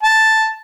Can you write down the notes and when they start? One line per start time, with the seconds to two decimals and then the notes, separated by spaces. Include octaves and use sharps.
0.03 A5